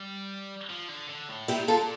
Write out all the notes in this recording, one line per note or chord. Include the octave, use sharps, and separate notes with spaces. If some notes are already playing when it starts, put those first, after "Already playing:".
Already playing: G3
F3
D3
D3
A2
A#2 E4 G4
F4 A4